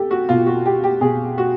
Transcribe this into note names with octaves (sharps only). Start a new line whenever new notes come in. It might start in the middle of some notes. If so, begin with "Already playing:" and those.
Already playing: G4 A4
F#4
B2 F4
F#4
G4
G4
B2 G#4
F#4